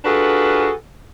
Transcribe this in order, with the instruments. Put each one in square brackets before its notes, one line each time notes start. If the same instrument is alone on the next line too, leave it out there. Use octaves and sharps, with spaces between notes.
[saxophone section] D4 F4 F#4 G#4 A4 B4